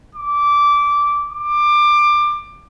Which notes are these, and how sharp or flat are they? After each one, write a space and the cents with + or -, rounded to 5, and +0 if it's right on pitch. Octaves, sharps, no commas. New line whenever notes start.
D6 -15
D6 +20